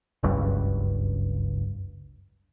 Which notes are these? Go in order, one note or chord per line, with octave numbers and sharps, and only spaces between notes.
F#1 C#2 G2